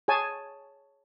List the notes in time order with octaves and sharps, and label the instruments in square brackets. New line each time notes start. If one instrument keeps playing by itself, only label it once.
[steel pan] G#4 C#5 G#5 A5